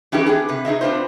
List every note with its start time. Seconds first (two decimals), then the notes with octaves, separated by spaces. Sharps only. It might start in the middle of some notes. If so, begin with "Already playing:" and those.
0.12 E3 C#4 D#4 G4 G#4 B4
0.26 B3 D4 G#4
0.49 C3 B4
0.65 D#4 G#4 D#5 E5
0.81 B3 C4 D4 F4 B4 C5